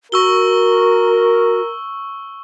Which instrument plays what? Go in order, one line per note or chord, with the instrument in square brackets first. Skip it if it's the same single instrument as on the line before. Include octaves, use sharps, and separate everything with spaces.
[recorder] F#4 [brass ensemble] A#4 [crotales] C#6 E6 G7